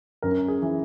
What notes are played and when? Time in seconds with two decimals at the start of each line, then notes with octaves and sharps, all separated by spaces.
0.22 F#2 A#4
0.48 G#4
0.62 E3